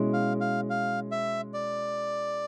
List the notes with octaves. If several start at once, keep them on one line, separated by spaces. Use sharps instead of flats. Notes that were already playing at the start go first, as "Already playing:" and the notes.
Already playing: B2 G#3 C#4 E4
F5
F5
F5
E5
D5